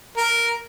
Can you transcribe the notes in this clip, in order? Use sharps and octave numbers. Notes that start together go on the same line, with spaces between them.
A#4